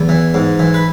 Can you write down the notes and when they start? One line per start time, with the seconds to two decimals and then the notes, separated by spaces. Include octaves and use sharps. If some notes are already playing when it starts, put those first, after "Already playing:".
Already playing: E2
0.09 E3
0.34 G#2
0.59 E3
0.74 B4